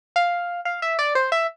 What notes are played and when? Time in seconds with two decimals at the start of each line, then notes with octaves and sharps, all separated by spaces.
0.16 F5
0.65 F5
0.82 E5
0.99 D5
1.15 C5
1.32 E5